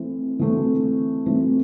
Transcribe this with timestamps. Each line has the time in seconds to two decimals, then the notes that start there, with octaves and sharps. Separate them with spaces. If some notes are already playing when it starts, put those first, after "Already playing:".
Already playing: E3 A3 C4
0.39 E3 A3 C4
1.26 E3 A3 C4